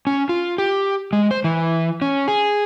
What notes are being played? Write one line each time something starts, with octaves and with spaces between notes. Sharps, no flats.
C#4
F4
G4
G#3
C5
E3
C#4
G#4